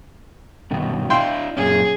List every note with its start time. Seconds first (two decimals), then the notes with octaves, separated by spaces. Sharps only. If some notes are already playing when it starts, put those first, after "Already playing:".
0.71 G2 B2 D#3
1.10 D4 E4 F5 G5 C6
1.57 F#2 A#2 C#4 G#4